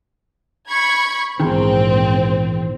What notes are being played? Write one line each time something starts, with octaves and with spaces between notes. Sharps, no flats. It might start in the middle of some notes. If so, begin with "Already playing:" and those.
B5 C#6 G#6
A#1 E2 G#2 D#3 C4